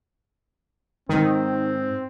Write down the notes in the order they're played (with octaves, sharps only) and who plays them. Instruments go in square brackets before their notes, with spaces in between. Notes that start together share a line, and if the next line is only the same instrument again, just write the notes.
[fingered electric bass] G#2 [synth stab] D#3 [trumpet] C4